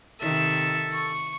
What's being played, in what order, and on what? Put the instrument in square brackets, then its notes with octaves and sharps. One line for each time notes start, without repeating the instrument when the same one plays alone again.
[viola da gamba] C3 D#3 [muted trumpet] A4 [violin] E5
[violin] C#6